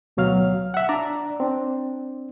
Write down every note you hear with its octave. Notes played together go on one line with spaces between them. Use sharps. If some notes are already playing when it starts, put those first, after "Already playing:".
D2 B2 F#3 F5 F6
E5 F#5
D4 D5 A#5
C4 D4